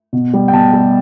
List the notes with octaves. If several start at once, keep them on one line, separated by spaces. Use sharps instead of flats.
B2
G3
G5
B2 A5
G3